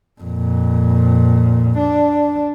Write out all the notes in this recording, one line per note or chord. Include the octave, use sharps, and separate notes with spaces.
F2 A#2
D4